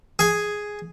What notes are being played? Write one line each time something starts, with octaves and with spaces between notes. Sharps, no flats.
G#4 G#5